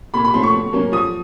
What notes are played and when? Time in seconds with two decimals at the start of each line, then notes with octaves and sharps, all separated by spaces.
0.14 A#2 B5
0.24 B5
0.34 F3 A3 C#4 C6
0.43 C#6
0.53 B2
0.72 F#3 A#3 C#4
0.92 F3 D#6